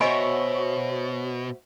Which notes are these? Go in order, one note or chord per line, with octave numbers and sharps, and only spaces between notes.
B2 F#4 C5 C#5 D#5 E5 G#5 B5